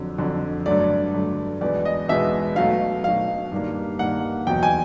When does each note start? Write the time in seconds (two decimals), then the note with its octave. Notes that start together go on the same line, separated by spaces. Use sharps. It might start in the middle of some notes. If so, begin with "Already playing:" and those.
Already playing: F2 D3 F#3
0.18 F2 D3 F#3
0.66 G2 D3 F#3 A3 D5
1.14 G2 D3 F#3 A3
1.61 E2 B2 G#3 B3 D5
1.85 D#5
2.09 E2 B2 G#3 B3 E5
2.56 B2 F#3 A3 F5
3.04 B2 F#3 A3 F5
3.52 G2 D#3 G3 A#3
3.99 G2 D#3 G3 A#3 F#5
4.47 E2 B2 F#3 G5
4.63 G#5